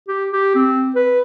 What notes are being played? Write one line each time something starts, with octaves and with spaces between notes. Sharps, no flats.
G4
G4
C4
B4